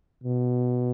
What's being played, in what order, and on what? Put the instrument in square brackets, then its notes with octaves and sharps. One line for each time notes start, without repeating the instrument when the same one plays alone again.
[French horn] B2